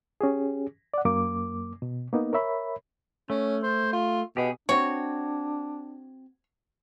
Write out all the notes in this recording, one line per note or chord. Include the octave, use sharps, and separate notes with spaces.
C#4 G4 G#4
D5 F#5
F#2 A#3 D6
B2
A#3 B3 D#4
A#4 C#5 E5 B5
A3 C#4
C5
F4
B2 G4 G#4
C4 D4 F#4 C#5